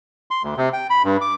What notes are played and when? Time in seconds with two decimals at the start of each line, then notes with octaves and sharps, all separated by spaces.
0.31 C6
0.43 D2
0.57 C3
0.73 G5
0.90 B5
1.04 G2
1.21 D6